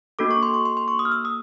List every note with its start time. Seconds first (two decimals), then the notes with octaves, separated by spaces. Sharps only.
0.19 A#3 D4 F#4 A4 D6
0.31 C#6
0.43 C6
0.54 C#6
0.65 C6
0.77 C6
0.88 C#6
0.99 D#6
1.05 F6
1.12 E6
1.25 D#6